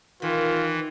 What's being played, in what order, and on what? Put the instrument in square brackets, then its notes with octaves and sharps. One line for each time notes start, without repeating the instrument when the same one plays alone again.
[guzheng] D#3 [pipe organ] E3 [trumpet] F4